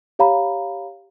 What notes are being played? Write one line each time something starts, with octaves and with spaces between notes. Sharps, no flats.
G4 C#5 F5 A#5 B5